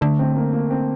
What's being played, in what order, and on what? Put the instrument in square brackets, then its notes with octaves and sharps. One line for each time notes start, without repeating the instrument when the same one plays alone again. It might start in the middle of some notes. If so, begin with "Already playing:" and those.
[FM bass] D3 [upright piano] A3
[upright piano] C4
A#3
A#3
C4